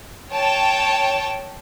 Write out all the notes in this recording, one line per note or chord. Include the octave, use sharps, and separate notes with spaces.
C#5 G5 A5